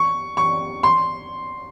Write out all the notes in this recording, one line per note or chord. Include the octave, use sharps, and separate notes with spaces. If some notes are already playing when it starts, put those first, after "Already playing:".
Already playing: C#6
C#6
C6